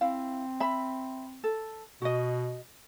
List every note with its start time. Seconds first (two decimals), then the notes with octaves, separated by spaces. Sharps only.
0.01 C4 E4 F5
0.60 E5 B5
1.44 A4
2.02 B2 F#4 D#5